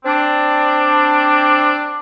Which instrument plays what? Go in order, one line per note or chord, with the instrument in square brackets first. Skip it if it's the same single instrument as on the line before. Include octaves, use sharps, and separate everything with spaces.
[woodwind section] C4 D4